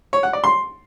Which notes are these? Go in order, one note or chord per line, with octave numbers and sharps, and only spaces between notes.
C#5
F#5
D5
C6